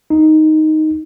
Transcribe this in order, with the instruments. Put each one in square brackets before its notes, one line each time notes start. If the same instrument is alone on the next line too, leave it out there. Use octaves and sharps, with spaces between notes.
[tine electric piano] D#4